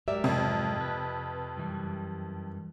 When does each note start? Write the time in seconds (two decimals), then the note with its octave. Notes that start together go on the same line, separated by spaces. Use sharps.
0.08 G#2 F#3 G4 A#4 D5 E5
0.24 F2 C3
0.81 B4
1.57 F#2 E3 G3